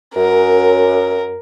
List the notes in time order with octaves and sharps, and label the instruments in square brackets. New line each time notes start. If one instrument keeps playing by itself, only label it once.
[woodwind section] F#2 [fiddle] A#4